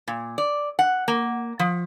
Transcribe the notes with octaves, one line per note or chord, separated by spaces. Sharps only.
A#2
D5
F#5
A#3
F3